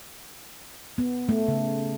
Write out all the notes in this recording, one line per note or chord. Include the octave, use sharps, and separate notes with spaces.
B3
A3
C#3